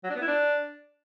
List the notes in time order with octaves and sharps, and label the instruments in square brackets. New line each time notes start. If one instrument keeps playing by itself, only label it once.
[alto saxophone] F#3
D4
B3
E4
D4